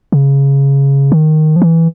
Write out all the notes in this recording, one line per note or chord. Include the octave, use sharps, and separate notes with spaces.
C#3
D#3
F3
E3